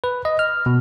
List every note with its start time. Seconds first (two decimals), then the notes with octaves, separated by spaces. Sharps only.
0.04 B4
0.25 D#5
0.39 F6
0.66 B2